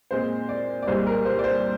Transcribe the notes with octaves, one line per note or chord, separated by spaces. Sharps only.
A#2 G#3 C4 C5
D5
D5
C2 A#2 G#3 C5
A#4
C5
D5
C5